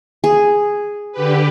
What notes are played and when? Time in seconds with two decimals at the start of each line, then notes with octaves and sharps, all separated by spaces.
0.24 G#4
1.12 D3 G4 B4